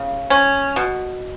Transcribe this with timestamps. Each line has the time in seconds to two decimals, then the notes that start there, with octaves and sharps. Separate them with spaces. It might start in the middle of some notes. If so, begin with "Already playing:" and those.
Already playing: C#3
0.30 C#4
0.76 B2